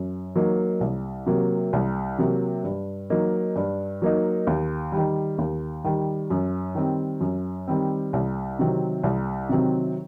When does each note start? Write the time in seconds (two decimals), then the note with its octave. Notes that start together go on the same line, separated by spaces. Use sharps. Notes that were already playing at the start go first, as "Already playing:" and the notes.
Already playing: F#2
0.36 F#3 A#3 D#4
0.81 C2
1.26 C3 F#3 A#3
1.73 C2
2.19 C3 F#3 A#3
2.64 G2
3.10 F#3 A#3 D#4
3.56 G2
4.02 F#3 A#3 D#4
4.47 D#2
4.92 D#3 G3
5.38 D#2
5.84 D#3 G3
6.30 F#2
6.75 D#3 G3 C4
7.21 F#2
7.68 D#3 G3 C4
8.13 C2
8.59 C3 D#3 F#3 C4
9.04 C2
9.49 C3 D#3 F#3 C4